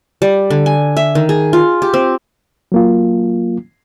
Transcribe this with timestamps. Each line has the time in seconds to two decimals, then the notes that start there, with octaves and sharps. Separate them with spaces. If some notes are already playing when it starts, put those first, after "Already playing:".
0.22 G3
0.50 D3
0.66 G#5
0.97 E5
1.15 D#3
1.29 G#4
1.53 F4
1.82 G4
1.94 C4
2.72 F#3 A#3 F4